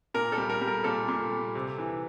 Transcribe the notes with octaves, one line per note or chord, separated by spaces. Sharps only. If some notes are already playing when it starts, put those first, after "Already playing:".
A#2 A#4
A4
G3
A#4
G3
A#4
A#2 A4
A#2
G3
C3
E3